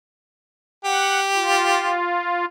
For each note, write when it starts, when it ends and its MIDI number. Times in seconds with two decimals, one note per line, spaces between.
0.85 1.99 67
0.85 1.20 78
1.35 2.45 65